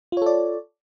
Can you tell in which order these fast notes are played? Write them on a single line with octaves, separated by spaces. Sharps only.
F4 C#5 A4 D5